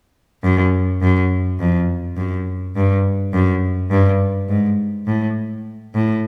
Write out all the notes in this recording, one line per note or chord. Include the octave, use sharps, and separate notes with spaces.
F#2
F#2
F2
F#2
G2
F#2
G2
G#2
A2
A2